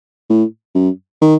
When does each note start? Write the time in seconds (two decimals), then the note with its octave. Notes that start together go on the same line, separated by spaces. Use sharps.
0.30 A2
0.75 F#2
1.22 D#3